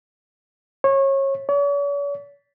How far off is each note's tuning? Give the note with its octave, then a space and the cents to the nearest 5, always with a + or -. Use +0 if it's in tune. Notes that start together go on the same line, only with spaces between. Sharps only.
C#5 -25
C#5 +45